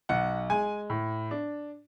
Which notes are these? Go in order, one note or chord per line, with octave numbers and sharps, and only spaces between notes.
B1 F#5
G#3 G#5
A2
D4